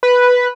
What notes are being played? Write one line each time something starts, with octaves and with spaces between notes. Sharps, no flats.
B4